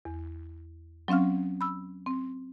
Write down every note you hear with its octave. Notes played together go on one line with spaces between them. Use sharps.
E2
F#3 C4 C#4 F5 F6
B5 E6
C4